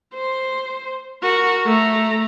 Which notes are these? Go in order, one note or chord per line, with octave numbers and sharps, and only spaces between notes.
C5
F#4 A#4
A3 A#5